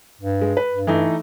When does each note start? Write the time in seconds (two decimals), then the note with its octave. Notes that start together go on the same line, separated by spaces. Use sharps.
0.21 G2
0.41 G#3
0.57 B4
0.71 G2
0.87 E3 A3 D#4